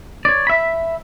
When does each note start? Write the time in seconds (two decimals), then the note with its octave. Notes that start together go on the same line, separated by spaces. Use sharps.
0.25 C#5 D5
0.47 E5 B5